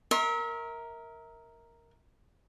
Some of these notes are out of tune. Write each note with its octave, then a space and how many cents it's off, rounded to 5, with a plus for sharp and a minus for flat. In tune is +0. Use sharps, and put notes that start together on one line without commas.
A#4 +0 E5 -35 C6 +40